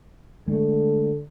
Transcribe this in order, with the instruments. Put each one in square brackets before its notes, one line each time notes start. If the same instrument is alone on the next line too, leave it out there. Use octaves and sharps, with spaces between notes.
[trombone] D3 [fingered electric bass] G#3 A3